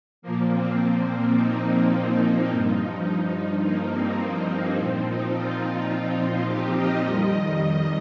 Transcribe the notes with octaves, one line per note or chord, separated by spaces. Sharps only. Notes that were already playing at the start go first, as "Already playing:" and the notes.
A#2 F3 A#3
C4
A#3
C4
D#4
G2 F3 D#4
A#3
C4
D#4
A#2 F3 C4
D#4
F4
G4
D#5
F2 D#3 G3 D#5